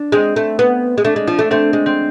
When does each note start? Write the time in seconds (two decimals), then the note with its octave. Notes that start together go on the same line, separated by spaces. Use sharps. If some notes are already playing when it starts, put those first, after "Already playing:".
Already playing: D4
0.12 G#3 C4
0.36 A3
0.59 B3
0.98 G#3
1.04 A3 D4
1.16 G#3
1.28 F3
1.39 A3 D4
1.51 A3 C4
1.73 G#3
1.86 C4